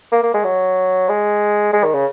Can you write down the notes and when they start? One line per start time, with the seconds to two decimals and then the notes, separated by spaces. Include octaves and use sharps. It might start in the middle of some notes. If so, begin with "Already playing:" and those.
0.12 A#3
0.23 A#3
0.34 G#3
0.44 F#3
1.09 G#3
1.73 G#3
1.84 D#3
1.94 C#3